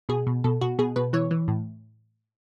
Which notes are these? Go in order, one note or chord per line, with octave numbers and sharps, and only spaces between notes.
B2 G#4
B2
B2 A4
B2 F#4
B2 G#4
B2 B4
E3 C#5
E3
A2